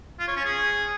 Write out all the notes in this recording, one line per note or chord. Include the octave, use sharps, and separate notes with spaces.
F4
C#5
C#4
G#4